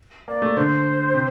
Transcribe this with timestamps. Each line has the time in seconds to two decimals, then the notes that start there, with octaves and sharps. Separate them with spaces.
0.28 A#3 D5
0.42 A3
0.56 D3 C5
1.14 C3